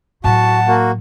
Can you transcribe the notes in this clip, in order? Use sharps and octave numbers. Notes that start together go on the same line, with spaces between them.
A2 F#3 F#4 F#5 A5
A#3 F#4